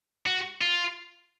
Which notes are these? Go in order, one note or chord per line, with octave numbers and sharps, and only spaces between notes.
F#4
F4